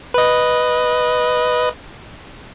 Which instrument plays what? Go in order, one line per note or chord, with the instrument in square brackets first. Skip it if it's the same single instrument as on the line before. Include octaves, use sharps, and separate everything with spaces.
[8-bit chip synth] B4 D#5